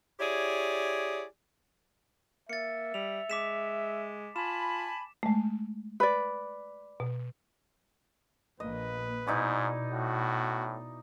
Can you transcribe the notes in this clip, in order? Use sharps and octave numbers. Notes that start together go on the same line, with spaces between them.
E4 G4 G#4 C#5 D5
A#3 E5 A6 C#7
G3 F7
G#3 D6 B6 E7
F4 G#5 A5 B5 E7
G#3 A3
B4 D5
B2
A#1 A#3 B4 D#5
G#2 B2 D#4 E4 D5
A2 F#4